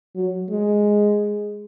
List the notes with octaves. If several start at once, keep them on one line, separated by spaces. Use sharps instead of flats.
F#3
G#3